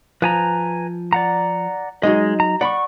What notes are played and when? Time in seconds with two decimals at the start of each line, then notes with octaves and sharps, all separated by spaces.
0.22 F3 B4 G#5 A#5
1.13 D5 F#5 A#5
2.03 F#3 G#3 D#4 D#5
2.40 A#5
2.61 D5 F#5 B5 C#6